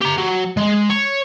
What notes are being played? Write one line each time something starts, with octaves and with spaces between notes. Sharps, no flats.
G4 A#5
F#3
G#3
C#5